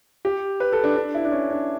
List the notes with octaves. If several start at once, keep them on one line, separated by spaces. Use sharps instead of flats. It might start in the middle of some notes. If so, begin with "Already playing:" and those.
G4
B4
A4
D4
D4
E4
D4
C#4
D4